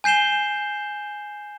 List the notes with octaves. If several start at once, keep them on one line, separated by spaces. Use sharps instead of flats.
G#5 G6 C7 E7 G7